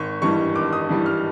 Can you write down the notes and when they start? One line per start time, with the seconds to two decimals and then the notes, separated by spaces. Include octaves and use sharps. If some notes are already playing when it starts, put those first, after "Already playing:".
Already playing: G#1 C#6
0.22 G2 E3 G3 C#6
0.55 G#1 D6
0.73 D#6
0.89 G2 E3 G3
1.06 F6